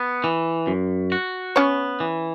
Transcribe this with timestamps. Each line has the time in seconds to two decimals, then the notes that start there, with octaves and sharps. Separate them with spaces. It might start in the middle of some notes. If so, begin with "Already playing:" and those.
Already playing: B3
0.24 E3
0.67 F#2
1.12 F#4
1.56 B3 C#4 C#5
2.00 E3